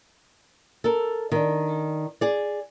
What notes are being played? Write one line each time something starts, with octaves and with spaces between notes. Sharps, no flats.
A4 A#4
D#3 D4
G#4 D5